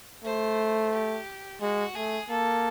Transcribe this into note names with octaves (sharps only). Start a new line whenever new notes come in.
A3 C5
G4
G#3 F#4
A3 G#4
A#3 A4